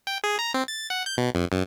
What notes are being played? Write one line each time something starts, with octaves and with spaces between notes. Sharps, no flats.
G5
G#4
A#5
C4
A6
F#5
G6
B2
F2
F#2